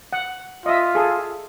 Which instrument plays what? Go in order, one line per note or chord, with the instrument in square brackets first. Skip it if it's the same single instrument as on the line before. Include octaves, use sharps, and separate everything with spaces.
[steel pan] F#5
[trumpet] F4 [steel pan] D#5 E5
[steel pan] G#4 A4